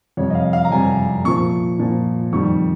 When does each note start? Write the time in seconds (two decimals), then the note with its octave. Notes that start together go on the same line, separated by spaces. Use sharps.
0.17 F2 C3 G3 C#5
0.30 D#5
0.35 F5
0.53 F5
0.65 A#5
0.71 F2 C3 G3 G#5
1.25 A#2 F3 C#6
1.79 A#2 F3
2.33 F2 D#3 G3 C#6